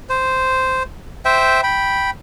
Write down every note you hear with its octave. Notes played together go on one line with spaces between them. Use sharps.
C5
C5 E5 G5
G5 B5